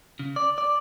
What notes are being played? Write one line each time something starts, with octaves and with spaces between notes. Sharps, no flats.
C#3
D5
D5